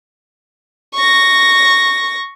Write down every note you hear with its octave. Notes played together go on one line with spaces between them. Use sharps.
C#6 A#6